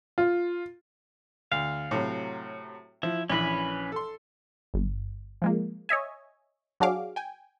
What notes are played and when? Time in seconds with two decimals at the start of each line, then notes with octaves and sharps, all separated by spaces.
0.18 F4
1.52 D2 F5
1.91 A2 C3 F#3
3.03 F3 E4
3.30 A#1 E3 C#4 B4 B5
3.92 A4 C6
4.74 G1
5.42 F3 G#3 A#3
5.89 C#5 D#5 E5 G#5
6.80 F#3 D4 F#4 G#4 F5 D6
7.16 G5 G#5